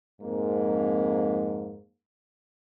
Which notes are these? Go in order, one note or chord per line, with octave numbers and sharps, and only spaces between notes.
F2 G#2 A#3